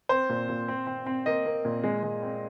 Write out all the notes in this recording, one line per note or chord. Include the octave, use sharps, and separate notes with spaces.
C4 C5
A#2
A#2
C4
C4
C4
A#3 D#5
A#3
A#2
G#3
G#3
C4